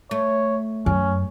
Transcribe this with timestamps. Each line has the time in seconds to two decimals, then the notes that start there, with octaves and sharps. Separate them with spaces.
0.11 A3 C#5
0.86 F#2 C#4